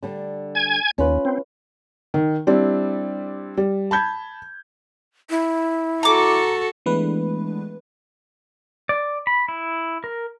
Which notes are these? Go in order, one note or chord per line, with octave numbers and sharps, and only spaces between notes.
D3 G3 D4
G#5 G#6
D#2 C#4 F4 B4
C4
D#3
G3 C4 D4 E4
G3
A5 B5 G6 G#6
E4
F#4 A4 A#5 D6
E3 G#3 A3 B3 D4 B4
D5
B5
E4
A#4